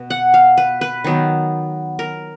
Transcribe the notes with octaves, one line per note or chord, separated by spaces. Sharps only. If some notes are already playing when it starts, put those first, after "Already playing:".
Already playing: B2
F#5
F5
B4
B4
D#3 F#3 B3
A#4